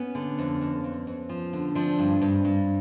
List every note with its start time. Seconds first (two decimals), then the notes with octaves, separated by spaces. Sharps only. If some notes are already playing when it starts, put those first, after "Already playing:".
Already playing: B3 C#4
0.15 D3
0.38 F2
0.61 F2
0.84 F2
1.07 F2
1.29 F3
1.53 D3
1.75 F3 C4 D4
1.98 G2
2.21 G2
2.45 G2